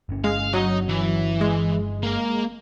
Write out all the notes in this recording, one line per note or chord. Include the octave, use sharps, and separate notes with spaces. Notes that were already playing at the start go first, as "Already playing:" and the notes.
G1 C#4
G#3 F5
F#3 D#4
E3
G#3
A#3 F5